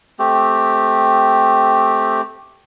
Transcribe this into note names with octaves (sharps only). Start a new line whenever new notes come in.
A3 C4 G4